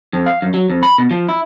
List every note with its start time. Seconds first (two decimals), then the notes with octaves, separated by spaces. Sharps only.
0.13 F2
0.26 F5
0.42 F#2
0.54 F#3
0.70 F2
0.83 B5
0.98 B2
1.11 F3
1.29 E4